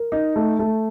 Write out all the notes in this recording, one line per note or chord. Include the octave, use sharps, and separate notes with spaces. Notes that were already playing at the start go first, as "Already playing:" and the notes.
Already playing: A#4
D#4
A3
A3